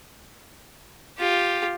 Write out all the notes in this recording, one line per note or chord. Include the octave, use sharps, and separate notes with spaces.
F4 G4